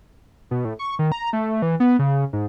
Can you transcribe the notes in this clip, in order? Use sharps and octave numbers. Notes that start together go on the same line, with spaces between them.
B2
A2
C#6
D#3
A#5
A3
E3
B3
C#3
G#2